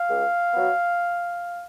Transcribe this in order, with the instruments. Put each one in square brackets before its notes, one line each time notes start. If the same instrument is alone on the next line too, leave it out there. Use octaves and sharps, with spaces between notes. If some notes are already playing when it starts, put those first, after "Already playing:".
Already playing: [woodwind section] F5
C#2
B2 F#3 B3